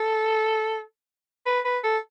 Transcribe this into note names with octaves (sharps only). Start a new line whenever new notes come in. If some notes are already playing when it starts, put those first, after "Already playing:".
Already playing: A4
B4
B4
A4